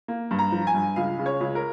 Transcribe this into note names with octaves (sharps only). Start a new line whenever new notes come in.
A#3
G2
A#5
F3
G#5
G2
C#2 F5
C#3
C#5
C#2
A#4